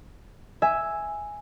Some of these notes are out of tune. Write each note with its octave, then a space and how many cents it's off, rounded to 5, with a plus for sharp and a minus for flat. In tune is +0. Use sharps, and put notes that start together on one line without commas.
E5 +0 G#5 +0